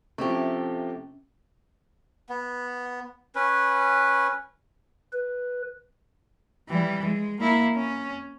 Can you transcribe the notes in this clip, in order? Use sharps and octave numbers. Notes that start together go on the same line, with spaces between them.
C3 F3 A3 C#4 E4 G4
B3
C#4 B4
B4
E3 G3
G#3
A#3 E4
C#4